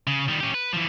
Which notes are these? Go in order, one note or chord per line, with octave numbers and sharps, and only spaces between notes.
C#3
D#3 G3
C#4 G4
B4
E3 F3